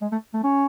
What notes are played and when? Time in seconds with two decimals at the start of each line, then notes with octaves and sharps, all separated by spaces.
0.02 G#3
0.12 A3
0.34 A3
0.44 C#4